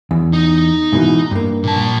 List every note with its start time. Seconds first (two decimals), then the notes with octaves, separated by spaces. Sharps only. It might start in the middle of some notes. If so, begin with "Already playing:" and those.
0.11 E2
0.33 D#4
0.93 G#2 B2 E3
1.31 G2 A#3
1.64 A#2 A5